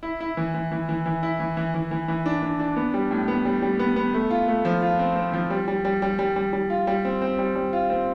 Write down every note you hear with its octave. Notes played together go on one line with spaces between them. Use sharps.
E4
E4
E3
E3
E3
E3
E3
E4
E3
E3
E3
E3
E3
D4
D4
D4
B3
G3
A2
B3
G3
G3
B3
B3
A3
F4
A3
F3
F4
C4
C4
F3
G3
G3
G3
G3
G3
G3
G3
F4
G3
C4
C4
G3
G3
F4
C4